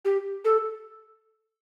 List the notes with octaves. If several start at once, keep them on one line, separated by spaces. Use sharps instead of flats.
G4
A4